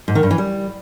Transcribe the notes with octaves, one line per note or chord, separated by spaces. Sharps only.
G#2
D#3
G2
E3
G3